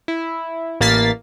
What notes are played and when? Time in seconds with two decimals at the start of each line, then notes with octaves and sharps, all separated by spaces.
0.08 E4
0.80 A1 A#3 A#4 A6 B6 C7